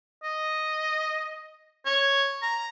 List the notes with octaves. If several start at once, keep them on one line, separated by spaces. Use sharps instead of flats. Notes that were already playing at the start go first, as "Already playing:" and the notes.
D#5
C#5
A#5